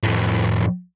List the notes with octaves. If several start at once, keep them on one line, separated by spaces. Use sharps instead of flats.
F2 A2